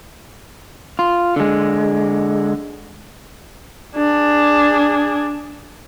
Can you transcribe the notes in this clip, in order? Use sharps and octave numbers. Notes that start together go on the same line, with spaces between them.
F4
D3 G#3
D4 G#4